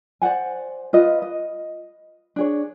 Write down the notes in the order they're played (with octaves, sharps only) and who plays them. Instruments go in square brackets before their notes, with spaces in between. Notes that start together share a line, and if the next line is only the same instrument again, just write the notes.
[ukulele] C5 D5 F#5 G#5
F4 B4 D#5
D#5
D4 G#4 C#5